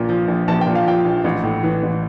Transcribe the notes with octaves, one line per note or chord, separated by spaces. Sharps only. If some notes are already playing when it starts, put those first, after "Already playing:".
Already playing: A#1 A#2
F3
A#1
A#1 A5
A#2 G5
F5
F3 G5
A#1
A1
A2
E3
A1